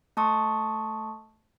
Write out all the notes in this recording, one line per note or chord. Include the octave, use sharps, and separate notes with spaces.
A3 A5 C6 C#6 D#6 E6